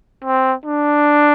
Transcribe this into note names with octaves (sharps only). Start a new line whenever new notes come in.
C4
D4